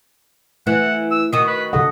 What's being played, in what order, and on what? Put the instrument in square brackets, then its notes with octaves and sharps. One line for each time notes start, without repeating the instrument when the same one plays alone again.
[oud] E3 [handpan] A3 [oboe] F#5
[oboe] E6
[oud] D#3 F#4 [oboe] D#6
[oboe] B4
[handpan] D3 A4 F#5 [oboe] D#5